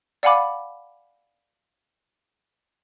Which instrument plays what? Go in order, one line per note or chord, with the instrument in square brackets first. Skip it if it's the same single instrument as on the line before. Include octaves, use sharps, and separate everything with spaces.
[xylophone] D5 F5 F#5 G#5 B5 D6